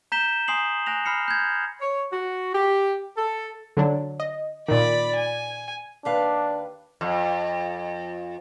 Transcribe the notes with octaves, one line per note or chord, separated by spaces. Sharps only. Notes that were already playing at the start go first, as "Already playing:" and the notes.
A#5 G6 B6 E7 G7
G#5 C6 D#6 C7 F#7
G#5 F#6 A#6 F7
B5 F6 C7 C#7
G6 G#6
C#5
F#4
G4
A4
D3 F#3 D4
D#5
A#2 D#3 D5 B5
G#5
D#2 D4 B4 F5
F2